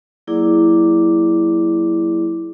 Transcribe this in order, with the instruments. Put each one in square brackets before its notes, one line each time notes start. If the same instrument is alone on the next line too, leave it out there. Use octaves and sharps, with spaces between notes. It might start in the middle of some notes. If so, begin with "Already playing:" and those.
[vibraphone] F#3 A#3 E4 G#4 D5 D6